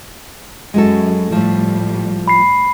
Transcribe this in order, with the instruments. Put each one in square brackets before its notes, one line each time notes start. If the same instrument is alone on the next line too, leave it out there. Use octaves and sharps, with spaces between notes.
[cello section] F#2 [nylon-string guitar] G#3 F#4 A4
[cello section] A2 G3 [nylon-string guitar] F3 A3
[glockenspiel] B5 C7